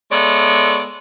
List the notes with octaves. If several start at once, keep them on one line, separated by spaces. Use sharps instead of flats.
G#3 B3 A4 C#5 D5 E5